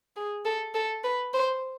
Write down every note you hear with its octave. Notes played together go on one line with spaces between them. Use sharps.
G#4
A4
A4
B4
C5